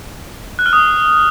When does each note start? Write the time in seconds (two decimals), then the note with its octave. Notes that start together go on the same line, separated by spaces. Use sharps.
0.59 F#6
0.66 F6
0.73 D#6